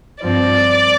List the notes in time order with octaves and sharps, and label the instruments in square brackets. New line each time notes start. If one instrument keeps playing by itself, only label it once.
[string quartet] G2 F3 C4 D5